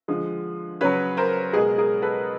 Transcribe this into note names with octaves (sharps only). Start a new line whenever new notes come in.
D3 F3 G#3
C#3 F#3 B4 C#5
A#4 C5
B2 G#3 G#4 A#4
G#4 A#4
A4 B4